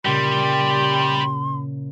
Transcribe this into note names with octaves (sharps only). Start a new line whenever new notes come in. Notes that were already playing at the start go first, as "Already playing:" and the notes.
A#2 C#3 G3 G4 C6